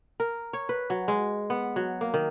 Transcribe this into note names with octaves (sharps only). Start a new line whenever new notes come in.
A#4
C#5
B4
F#3
G#3
B3
F#3
A#3
D#3